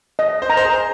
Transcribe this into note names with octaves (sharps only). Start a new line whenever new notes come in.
D#5
C5
A#4 A#5
C5
G#4